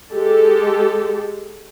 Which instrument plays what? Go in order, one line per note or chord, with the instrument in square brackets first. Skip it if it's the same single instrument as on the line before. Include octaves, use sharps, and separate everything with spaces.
[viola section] G#3 G4 A4